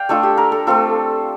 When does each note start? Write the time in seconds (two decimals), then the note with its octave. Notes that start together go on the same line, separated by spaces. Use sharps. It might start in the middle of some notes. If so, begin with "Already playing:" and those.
Already playing: D5 F5 G5
0.09 A3 D4 F4 A4
0.23 G4
0.37 A#4
0.52 A4
0.67 A3 C4 F4 A4